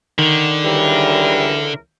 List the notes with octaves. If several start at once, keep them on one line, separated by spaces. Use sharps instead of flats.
D3 D#3
C#2 E3 G3 A#4